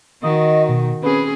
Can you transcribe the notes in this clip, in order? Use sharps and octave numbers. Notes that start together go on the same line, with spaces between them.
D#3 F#4 D#5
B2
C4 C#4 G#4 B4